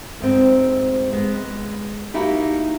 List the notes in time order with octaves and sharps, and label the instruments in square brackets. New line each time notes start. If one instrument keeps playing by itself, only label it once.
[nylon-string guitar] D2 G#2 C4
G#3 B3
A#3 D#4 E4 F#4 G4